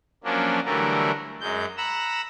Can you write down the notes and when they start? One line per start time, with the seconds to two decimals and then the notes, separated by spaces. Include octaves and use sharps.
0.24 F3 F#3 A#3 C#4 D4
0.64 D3 E3 F#3 G3 A3 A#4
1.41 F#2 G#3 G6
1.77 F#5 A#5 B5 E6